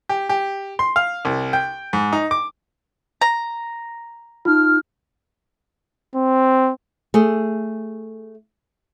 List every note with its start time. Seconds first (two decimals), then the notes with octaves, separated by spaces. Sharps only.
0.09 G4
0.29 G4
0.79 C6
0.96 F5
1.25 C2
1.53 G5
1.93 G#2
2.13 D#4
2.31 D6
3.22 A#5
4.45 D#4 F4 F6
6.15 C4
7.14 A3 G#4